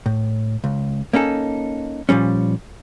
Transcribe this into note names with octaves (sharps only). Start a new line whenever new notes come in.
A2
C#2
A#3 C#4 D#4 A4
A#2 F3 G3 C#4